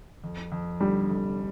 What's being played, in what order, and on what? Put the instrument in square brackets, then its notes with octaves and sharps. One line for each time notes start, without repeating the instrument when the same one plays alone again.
[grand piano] F2
F2
[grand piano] D3 [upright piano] G3
[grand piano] F1